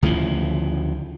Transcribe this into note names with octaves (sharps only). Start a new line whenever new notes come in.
D2 C#3 E3 F3